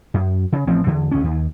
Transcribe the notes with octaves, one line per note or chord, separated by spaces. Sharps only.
F#2
C#3
A1 F3 C4
E2 D3
C#2 C#4
D#2